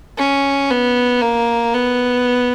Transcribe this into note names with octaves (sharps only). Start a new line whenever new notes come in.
C#4
B3
A#3
B3